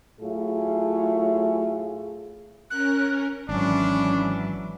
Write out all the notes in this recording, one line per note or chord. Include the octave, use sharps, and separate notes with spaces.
A2 F#3 A3 F4 G#4
C#4 A#4 F#6
G#1 E3 F#3 C#4 D4